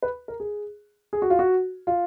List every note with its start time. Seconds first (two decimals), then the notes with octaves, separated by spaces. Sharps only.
0.03 B4
0.28 A#4
0.40 G#4
1.13 G#4
1.22 F#4
1.30 F4
1.39 F#4
1.87 F4